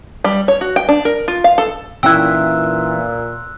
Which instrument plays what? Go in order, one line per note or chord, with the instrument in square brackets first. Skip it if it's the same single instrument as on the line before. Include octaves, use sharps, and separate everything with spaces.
[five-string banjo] G3
C#5
F#4
G5
D4
A#4
F4
F5
A4
[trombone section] A#2 [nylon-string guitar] E3 C#4 D#4 [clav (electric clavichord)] E4 G5 [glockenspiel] E6 F#6